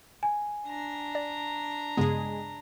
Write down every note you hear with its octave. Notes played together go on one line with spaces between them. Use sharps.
G#5
D4 A#5
D5
G2 C#3 G#3 B3 G#4